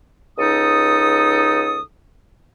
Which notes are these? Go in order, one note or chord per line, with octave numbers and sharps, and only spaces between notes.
C#2 D#4 A4 D#6